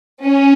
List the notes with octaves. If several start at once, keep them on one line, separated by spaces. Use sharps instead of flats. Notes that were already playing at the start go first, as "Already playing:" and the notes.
C#4